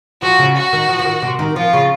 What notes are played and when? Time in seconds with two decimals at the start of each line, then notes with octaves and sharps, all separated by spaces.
0.22 F3 F#4
0.39 C#3
0.56 F#4
0.73 D#3
0.89 F3
0.99 F3
1.06 D#3
1.22 C3
1.39 D#3
1.56 F3 F4
1.73 C#3